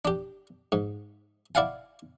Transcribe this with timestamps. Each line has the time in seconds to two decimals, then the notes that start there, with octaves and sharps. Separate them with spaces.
0.05 D4 G4
0.72 G#2
1.55 E4 D5 F5 F#5 G#5